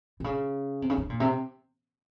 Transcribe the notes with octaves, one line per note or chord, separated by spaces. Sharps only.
C3
C#3
C3
C#3
C3
A#2
C3